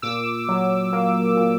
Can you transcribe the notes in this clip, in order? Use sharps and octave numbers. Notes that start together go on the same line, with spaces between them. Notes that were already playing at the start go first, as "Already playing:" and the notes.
A#2 D6 E6
F#3
A#3
A#2